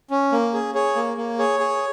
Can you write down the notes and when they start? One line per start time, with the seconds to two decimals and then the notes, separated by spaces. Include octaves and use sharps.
0.11 C#4
0.32 A#3
0.53 G#4
0.75 G#4 C#5
0.96 A#3
1.17 A#3
1.39 G#4 C#5
1.60 G#4